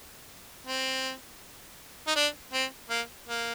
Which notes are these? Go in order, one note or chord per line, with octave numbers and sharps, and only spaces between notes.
C4
D#4
D4
C4
A#3
A#3